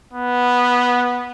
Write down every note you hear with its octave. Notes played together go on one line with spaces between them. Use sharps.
B3